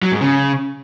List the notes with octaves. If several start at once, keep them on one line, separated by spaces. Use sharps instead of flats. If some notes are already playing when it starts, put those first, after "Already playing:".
F#3
G#2
C#3